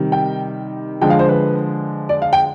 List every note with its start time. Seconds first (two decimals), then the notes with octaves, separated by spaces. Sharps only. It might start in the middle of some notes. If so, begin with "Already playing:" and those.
Already playing: C3 D#3 G3
0.12 G5
1.01 D3 F3 G#3 G5
1.10 F5
1.19 C5
1.28 B4
2.09 D5
2.22 F5
2.33 G5